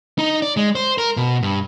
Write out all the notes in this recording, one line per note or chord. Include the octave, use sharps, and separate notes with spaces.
D#4
D5
G#3
C5
A#4
B2
G2